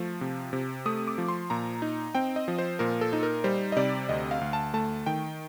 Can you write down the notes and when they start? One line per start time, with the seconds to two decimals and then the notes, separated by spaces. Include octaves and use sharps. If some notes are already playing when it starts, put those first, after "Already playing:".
Already playing: F3 A3
0.21 C3
0.53 C3
0.86 A3 D#6
1.08 D6
1.18 F3
1.28 C6
1.50 A#2 A#5
1.82 D#4
2.15 C4 G5
2.36 D#5
2.48 F3
2.59 C5
2.79 A#2 A#4
3.01 A4
3.13 D#4
3.23 A#4
3.44 G3 C5
3.72 D#5
3.76 C3 D5
4.09 D2 D#5
4.31 F5
4.41 D2
4.53 A5
4.74 A3 A5
5.06 D#3 G5